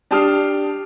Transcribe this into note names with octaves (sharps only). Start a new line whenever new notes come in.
D4 G4 A5 D#6 F6 C7